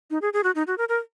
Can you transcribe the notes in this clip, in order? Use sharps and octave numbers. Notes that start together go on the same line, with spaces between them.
D#4
G#4
G#4
F#4
D#4
F#4
A#4
A#4